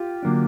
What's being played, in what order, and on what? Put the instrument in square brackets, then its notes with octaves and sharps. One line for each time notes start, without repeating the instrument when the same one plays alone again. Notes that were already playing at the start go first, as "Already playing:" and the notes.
Already playing: [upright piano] F4 G4
[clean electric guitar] D3 F#3 A#3 D4